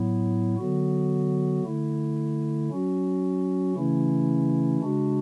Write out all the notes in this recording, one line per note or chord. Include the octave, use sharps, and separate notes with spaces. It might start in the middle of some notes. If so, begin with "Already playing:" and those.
Already playing: A2 F#3 B3 E4
D3 F#3 B3 F#4
D3 A3 E4
F#3 C#4 F#4
C#3 E3 A3 C#4 E4
C#3 G#3 D4 F#4